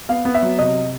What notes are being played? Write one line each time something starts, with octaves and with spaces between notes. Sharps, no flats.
B3 F5
B3
E5
F#3
C3 D#5